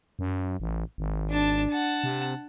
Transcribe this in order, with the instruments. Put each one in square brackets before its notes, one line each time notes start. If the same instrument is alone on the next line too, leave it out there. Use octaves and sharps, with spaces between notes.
[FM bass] F#2
A1
G#1
[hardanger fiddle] D4 A5
F#5 A5
[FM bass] C3